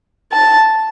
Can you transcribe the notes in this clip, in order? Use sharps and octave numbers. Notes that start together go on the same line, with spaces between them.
A5